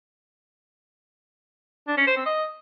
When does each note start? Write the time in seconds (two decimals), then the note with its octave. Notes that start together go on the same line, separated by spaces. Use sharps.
1.88 D4
1.97 C#4
2.07 C5
2.17 C4
2.26 D#5